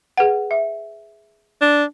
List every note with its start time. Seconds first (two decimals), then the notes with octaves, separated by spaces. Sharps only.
0.17 G#4 B4 F#5
0.51 E5
1.62 D4